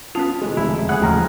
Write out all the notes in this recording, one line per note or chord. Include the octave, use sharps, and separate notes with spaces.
B3 C#4 F4 A5 D#6 F7
E1 E3 G#3
F1 E4
C#3 G#4 F#5 F#6
D#2 G#2 C#3 F3 A3 G5 A#5 F6